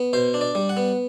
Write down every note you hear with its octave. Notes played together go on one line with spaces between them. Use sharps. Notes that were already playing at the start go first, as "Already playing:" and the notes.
Already playing: B3
B2 C5
D4
D5
G3
F#5
B3